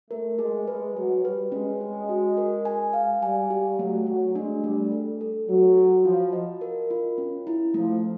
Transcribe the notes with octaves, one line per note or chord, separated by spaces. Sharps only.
A3 A#4
G#3 G#4
G#3 B4
F#3 G#4
G3 B4
G#3 C#4
C#4
F#4
A#4
G#5
F5
G3 G#5
G4
F#3 A3
F#3 A3
G#3 D4
G3 A3
A4
A4
F#3 F#4
F#4
F3 F4
D#5
A#4
F4
C#4
E4
F3 A3